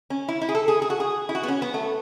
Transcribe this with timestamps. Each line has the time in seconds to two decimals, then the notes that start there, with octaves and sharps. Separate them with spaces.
0.10 C#4
0.28 E4
0.41 E4
0.49 G#4
0.55 A4
0.68 G#4
0.82 G#4
0.90 F#4
1.00 G#4
1.29 E4
1.35 F#4
1.43 B3
1.48 C#4
1.62 B3
1.74 A3